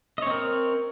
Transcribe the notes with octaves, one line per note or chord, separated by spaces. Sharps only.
C4 A#4 C#5 D#5